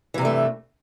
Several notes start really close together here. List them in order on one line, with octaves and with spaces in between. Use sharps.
E3 C3 G2 A3